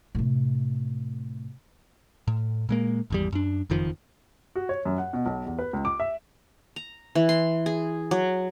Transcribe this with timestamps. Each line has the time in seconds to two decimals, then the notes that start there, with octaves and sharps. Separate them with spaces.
0.15 A2 C3
2.27 A2
2.69 A#2 G#3 A#3
3.10 G#1 E2 G3
3.32 F#2 D4
3.70 F#1 F2 D#3 F3
4.55 F#4
4.69 C#5
4.85 F#2
4.98 F#5
5.13 B2
5.26 B1
5.46 E2
5.59 B4
5.73 C#2
5.85 D6
6.00 E5
6.76 A#5
7.15 E3
7.29 C6
7.66 G#4
8.11 F#3